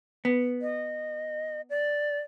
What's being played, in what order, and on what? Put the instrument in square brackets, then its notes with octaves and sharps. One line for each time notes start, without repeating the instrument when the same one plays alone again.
[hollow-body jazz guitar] B3
[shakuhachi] D#5
D5